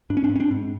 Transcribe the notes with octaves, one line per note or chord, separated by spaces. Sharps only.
G#2 D4
C#4
C4 D4
G#2
C#4
C4 D4
G#2